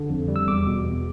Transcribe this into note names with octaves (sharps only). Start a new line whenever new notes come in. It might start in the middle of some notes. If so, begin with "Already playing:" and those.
Already playing: D3
F2
G3
E6
E2 D6
B2
E2